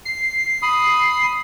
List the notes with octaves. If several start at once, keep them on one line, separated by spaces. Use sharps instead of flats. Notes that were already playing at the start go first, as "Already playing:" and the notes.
C7
B5 D#6